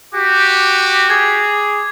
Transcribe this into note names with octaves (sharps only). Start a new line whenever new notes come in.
F#4 G4 D6
G#4 D6 G#6